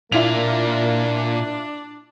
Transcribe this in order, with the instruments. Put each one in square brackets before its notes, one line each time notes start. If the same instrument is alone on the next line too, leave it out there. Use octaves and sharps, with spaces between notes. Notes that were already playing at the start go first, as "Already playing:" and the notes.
[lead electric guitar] A#2 [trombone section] A#3 [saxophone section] D4 [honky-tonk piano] E4 F4 F7